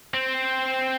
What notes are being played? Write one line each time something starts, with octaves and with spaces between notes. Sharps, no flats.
C4